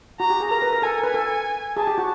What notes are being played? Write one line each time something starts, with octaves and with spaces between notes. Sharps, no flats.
F#4 A#5
G4
G#4
A#4 A#5
B4
A#4
A4 G#5
B4
A4
G#4 A5
G4
F#4